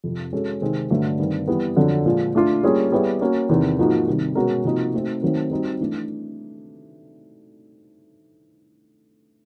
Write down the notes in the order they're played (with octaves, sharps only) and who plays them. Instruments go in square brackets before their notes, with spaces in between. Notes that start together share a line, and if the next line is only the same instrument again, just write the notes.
[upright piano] F2 C3 F3
G#3 C#4 F#4 A4
C3 D#3 G#3 C4
G2 D3 F#3 A3
G2 D#3 G3 C4
E3 G3 B3
F2 D3 F#3
A#2 F3 G#3
A3 D4 F4
G3 A#3 C#4 F4 G#4
G3 B3 E4 G#4 C#5
A#3 C#4 F#4
E2 C3 D#3
G#2 F3 A#3 D#4 F#4
C3 D#3 G3
B2 G#3 C#4 F#4 A#4
C3 F3 A#3 D#4 F#4
A3 C4 D#4 F#4
D#3 F#3 A3 C4
G3 C4 D#4 F#4
E3 A3 D4